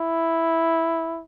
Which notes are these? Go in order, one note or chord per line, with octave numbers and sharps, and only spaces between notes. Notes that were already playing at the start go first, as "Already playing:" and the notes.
Already playing: E4